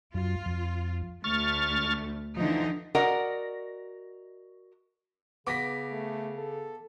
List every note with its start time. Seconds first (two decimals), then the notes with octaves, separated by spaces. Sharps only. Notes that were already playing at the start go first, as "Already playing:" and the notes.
0.14 F#2 F4
0.46 F2
1.24 D2 A3 C#6 F6 A6
2.37 D3 E3 F3 D#4
2.95 F#4 A#4 D5 D#5 F#5
5.47 C#3 B3 D6 A#6 B6
5.92 A3
6.37 A4